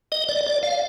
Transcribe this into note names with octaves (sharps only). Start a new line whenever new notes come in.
D#5
D5
D5
F5